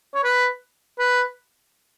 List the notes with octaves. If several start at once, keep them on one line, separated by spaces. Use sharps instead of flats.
C#5
B4
B4